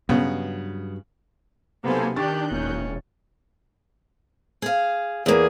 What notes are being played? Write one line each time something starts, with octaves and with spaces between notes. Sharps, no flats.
G2 C#3 F#3 B3
B1 C3 A#3 B3 A4 C5 G#5
D#3 D4 G4 C#6 F#6 G6 A6
E1 A#2 C#4
G#4 F5
E2 A#3 G#4